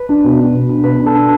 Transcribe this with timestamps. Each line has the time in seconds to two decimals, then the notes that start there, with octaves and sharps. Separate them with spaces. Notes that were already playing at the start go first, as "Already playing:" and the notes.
Already playing: B4
0.09 D4
0.24 B2
0.40 D4
0.54 B2
0.69 D4
0.84 B2 B4
0.99 D4
1.06 A4
1.14 D4